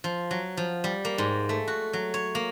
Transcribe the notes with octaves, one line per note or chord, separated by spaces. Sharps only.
F3
F#3
F3
G3
A#3
G#2
A3
F#4
F#3
C#5
A#3